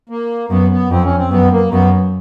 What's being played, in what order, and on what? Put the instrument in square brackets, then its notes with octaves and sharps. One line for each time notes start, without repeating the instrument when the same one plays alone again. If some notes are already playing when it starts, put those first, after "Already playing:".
[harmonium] A#3
[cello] F#2 [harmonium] B3
[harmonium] B3
[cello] F2 [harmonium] C4
[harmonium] C#4
C4
[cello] F#2 [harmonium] B3
[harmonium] A#3
[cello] F#2 [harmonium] B3